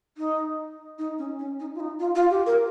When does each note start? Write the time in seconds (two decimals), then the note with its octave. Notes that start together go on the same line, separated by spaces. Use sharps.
0.18 D#4
0.99 D#4
1.18 C#4
1.39 C#4
1.60 D#4
1.75 F4
1.80 D#4
2.00 F4
2.15 F4
2.30 G4
2.46 A#4